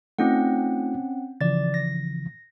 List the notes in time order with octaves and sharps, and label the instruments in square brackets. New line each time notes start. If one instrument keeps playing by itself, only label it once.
[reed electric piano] A3 D#4 F4 [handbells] C4 C#4 F#5
[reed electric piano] C#3 E3 F3 [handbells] D5 A6
[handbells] A#6